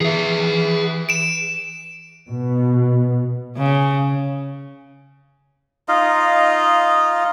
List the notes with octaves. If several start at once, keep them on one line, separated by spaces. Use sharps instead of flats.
E3 G#4 E5
D7 E7
B2
C#3
D#4 F4 D#5 F5